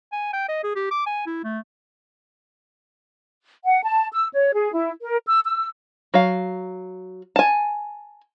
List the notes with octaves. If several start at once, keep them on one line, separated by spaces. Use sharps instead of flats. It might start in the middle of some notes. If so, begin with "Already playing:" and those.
G#5
G5
D#5
G#4
G4
D6
G#5
E4
A3
F#5
A5
E6
C#5
G#4
E4
A#4
E6
E6
F#3 F5
G#5 A5